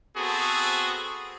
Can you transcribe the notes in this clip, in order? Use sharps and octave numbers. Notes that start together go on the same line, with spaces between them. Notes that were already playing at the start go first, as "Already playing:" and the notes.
B3 C4 F#4 G#4 A4